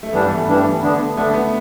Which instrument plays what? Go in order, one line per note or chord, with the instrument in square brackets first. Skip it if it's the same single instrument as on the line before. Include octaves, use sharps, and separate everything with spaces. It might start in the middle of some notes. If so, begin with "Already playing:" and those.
[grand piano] A3
[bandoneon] G2 E3 G3 D4 [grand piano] B3
[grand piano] A3
[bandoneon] G2 E3 G3 D4
D3 B3 D4
[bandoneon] D3 B3 D4 [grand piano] A3
[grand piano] B3